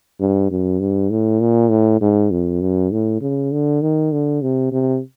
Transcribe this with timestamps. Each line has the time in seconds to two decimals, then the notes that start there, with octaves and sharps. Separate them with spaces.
0.20 G2
0.51 F#2
0.80 G2
1.11 A2
1.41 A#2
1.70 A2
2.01 G#2
2.31 F2
2.61 F#2
2.91 A2
3.22 C#3
3.52 D3
3.82 D#3
4.12 D3
4.42 C3
4.72 C3